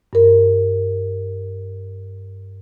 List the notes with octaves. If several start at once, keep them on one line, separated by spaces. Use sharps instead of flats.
G2 A#4